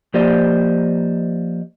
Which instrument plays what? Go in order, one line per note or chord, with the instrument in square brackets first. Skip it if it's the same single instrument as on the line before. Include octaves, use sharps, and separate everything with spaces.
[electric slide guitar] F3 A#3 G4 C5 D5 D#5